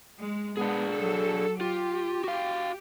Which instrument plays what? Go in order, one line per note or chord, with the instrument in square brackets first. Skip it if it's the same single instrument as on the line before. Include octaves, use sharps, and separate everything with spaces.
[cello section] G#3
[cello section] G#3 B3 [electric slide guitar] D4 G#4
[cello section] F#3 A4
[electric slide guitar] F4 [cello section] G4
[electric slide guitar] F#4 F5